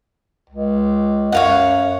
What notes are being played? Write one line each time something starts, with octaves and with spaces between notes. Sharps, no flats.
C#2
F#2 C#5 F5 F#5